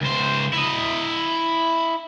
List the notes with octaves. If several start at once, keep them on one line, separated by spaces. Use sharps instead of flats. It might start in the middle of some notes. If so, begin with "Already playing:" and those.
C#2 C5
E4 D#5